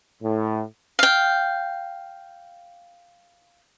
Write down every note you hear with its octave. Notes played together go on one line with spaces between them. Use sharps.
A2
F5 G5